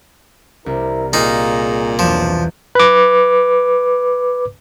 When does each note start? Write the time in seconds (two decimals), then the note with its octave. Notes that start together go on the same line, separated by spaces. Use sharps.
0.66 C2 C4 E4 A#4
1.13 A#2 D#4 G#4 F5
1.99 E1 A#1 E2 B2 F3 F#3 E7
2.75 B4 D6